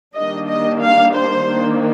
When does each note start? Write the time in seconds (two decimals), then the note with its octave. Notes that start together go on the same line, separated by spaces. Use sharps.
0.15 D#3 G3 A#3 D4 D#5
0.48 D#5
0.81 F5
1.14 C5
1.46 D#3 A#3 D4